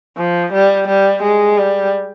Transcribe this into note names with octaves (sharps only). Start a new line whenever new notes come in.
F3
G3
G3
G#3
G3